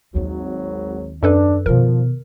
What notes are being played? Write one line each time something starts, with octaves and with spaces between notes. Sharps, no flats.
G#1 D#2 F#3 C4
F#2 D4 A4 B4
B2 D#3 F3 A#4